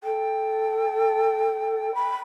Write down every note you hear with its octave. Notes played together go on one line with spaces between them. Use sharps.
A4 G5
B5